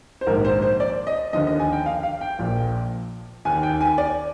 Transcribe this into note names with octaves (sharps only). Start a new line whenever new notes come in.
C5
A#1 G#2 D#3 A#4
C5
C5
D5
D#5
D#2 D3 F3 D#5
D#5
G#5
G5
F5
F5
G5
A#1 A#2 F3
D#2 D#3 G#5
G5
G#5
D5